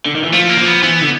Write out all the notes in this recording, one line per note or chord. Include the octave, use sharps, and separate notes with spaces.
D3
D#3
E3
F3 A3
A#3
F3
B3
E3 B3
D3